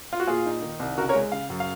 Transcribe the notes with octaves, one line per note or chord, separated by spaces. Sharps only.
F4
F#4
A#2 F4 G#4
D#4
D#3
C2
C#3 F#4 A#4
A#4 C#5
G#3
C#3 F5
F#2
F5